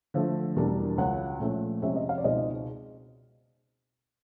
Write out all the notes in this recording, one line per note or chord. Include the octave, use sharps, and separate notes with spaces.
D3 F3 A3
E2 B2 G3 A#3 D4
C#2 C#3 F#3 F#5
A#2 F3 A3 C#4
F2 C3 F3 G#3 C#4 E5
D#5
F5
D5
C#2 B2 G#3 C4 D#4 D#5